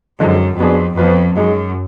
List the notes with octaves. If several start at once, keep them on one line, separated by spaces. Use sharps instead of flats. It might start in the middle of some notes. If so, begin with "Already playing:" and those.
F#2 D3 F3 G#3 D#4
F2 F#3 B3 D4 G#4
F2 F3 B3 F4 B4
F#2 G#3 D#4 G#4